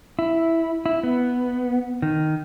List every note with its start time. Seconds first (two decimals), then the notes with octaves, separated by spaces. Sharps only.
0.19 E4
0.86 E4
1.03 B3
2.02 D#3